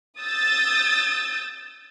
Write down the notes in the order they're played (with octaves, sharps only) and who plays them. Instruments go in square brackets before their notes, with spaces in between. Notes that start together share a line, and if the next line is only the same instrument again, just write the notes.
[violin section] D#6 E6 G6 A6